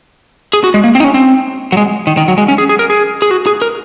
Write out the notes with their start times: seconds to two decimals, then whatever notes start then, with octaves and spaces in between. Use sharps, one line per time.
0.53 G#4
0.64 F#4
0.74 G#3
0.84 A#3
0.95 C4
1.00 D#4
1.04 C#4
1.14 C4
1.72 F#3
1.77 G#3
2.07 D#3
2.17 D#3
2.28 F#3
2.38 G#3
2.48 C#4
2.58 G#4
2.69 G#4
2.79 A#4
2.90 G#4
3.22 G#4
3.31 F#4
3.47 G#4
3.62 A#4